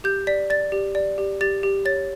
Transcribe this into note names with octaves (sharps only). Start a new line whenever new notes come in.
G4 G6
D5 B6
D5 A6
G4
D5
G4
G4 A6
G4
C#5 A6